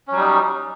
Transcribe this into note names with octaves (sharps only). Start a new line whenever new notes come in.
F#3 G3 C#4 D#4